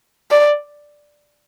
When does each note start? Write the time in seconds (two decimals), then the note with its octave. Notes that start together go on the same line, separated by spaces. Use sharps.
0.31 D5